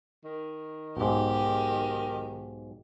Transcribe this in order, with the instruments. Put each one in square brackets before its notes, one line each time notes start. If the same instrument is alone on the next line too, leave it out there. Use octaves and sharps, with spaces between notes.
[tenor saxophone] D#3
[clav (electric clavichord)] B1 G#2 [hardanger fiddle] G4